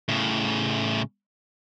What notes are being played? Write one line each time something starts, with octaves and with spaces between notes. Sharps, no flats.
A2 C#3